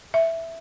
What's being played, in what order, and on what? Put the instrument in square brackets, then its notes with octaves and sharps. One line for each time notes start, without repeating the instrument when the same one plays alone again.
[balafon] E5